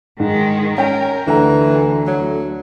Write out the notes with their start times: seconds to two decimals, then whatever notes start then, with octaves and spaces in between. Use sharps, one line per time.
0.20 G#2 D#3 G#3
0.78 C#4 A#4 G5
1.27 D2 D3 E3 A3 A#5
2.07 F#3